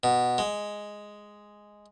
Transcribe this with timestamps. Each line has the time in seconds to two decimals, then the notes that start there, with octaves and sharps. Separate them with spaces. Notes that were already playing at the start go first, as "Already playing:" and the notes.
0.03 B2
0.38 G#3